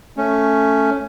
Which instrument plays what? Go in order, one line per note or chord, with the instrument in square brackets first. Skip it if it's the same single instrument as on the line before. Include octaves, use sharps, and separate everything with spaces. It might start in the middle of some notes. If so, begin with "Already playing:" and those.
[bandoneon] A3 C#4